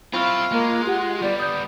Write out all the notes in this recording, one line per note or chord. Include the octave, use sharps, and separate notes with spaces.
C4 E4 F4 B5 C#6 F6
G#3 A#3
G4 F#5
G3 B3 D5
D5 D#6 G6